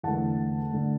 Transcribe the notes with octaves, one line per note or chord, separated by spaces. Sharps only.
E2 D3 A3 F#5 A5
D3 A3